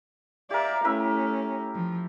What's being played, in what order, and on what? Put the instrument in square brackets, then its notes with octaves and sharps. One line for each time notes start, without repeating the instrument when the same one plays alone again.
[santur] G4 A#4 [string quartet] D5 E5 F5
[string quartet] A3 C#4 [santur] E4 A#4 E5
[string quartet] F3